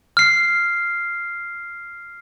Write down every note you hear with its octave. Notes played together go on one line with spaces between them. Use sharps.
F6 C7